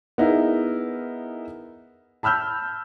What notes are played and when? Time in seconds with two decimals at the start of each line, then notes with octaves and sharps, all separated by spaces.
0.18 B3 D#4 E4 G#4 A#4
2.23 A5 B5 E6 F6 G6